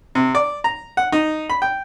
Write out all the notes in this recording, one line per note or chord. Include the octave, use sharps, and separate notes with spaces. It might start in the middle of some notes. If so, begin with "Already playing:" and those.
C3
D5
A#5
F#5
D#4
B5
G5